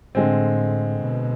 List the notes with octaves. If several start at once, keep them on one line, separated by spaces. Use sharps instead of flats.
A2 D3 G#3 C4
B2